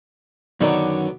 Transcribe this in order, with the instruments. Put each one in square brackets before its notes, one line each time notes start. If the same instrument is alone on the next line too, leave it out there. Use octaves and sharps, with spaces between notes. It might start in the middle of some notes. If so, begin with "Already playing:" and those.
[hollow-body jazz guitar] F#2 D#3 [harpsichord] D3 F#3 B3